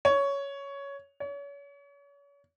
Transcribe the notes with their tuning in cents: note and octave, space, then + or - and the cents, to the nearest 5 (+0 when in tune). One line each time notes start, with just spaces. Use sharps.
C#5 +10
C#5 +35